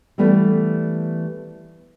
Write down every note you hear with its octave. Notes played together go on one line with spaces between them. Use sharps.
E3 G3 A3 B3